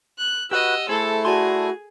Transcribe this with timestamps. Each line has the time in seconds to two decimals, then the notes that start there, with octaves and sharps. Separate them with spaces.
0.18 F#6
0.51 F#4 G4 B4 D#5 F#5 E6
0.89 A3 E4 G#4 A4 C5
1.25 F#4 G#4 D5 A5 C6